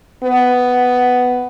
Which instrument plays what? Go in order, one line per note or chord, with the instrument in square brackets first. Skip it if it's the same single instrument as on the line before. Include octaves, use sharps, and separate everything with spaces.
[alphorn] B3